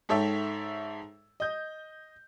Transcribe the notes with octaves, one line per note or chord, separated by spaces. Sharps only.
G#2 A4 C#5 E5 G5 E6
D#5 G6